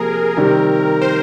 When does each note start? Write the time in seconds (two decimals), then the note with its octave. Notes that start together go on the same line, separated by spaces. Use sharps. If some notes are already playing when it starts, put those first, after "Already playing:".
Already playing: C3 F3 A#3 G#4 A#4
0.37 C3 D#3 G3
1.02 C5